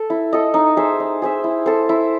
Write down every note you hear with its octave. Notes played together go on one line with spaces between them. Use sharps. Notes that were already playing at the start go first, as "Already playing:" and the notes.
Already playing: A4
E4
A4 D#5
D#4
G#4 C5 E5
D#4
G#4 C5 E5
E4
A4 C5
E4